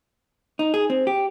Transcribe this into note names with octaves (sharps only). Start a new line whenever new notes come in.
D#4
G#4
C4
G4